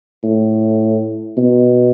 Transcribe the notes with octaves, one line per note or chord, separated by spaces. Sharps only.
A2
B2